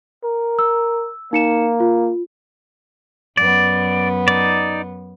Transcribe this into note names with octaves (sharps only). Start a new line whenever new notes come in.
A#4
E6
A#3 D#4 C#7 E7
F4
F#2 B3 D5
D#4 D5